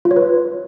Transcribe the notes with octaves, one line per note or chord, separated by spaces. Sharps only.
F4
C#5
B4